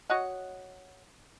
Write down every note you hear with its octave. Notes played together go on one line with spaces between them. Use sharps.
F#4 C#5 D#5 F#5